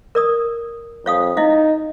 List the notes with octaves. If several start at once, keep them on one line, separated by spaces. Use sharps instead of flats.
A#4 D5 D#6
F2 C#5 F5 D#6
D#4 E4 D#5 F5